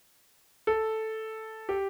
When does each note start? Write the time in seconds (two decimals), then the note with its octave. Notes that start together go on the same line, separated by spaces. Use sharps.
0.67 A4
1.69 G4